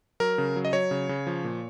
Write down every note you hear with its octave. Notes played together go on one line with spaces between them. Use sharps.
F#3 A#4
C#3
F#3
D#5
F#3 C#5
C#3
C#3
F3
A#2